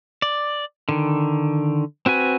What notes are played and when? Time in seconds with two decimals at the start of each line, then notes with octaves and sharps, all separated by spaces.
0.22 D5
0.89 D3 D#3
2.06 C4 F#4 B4 G#5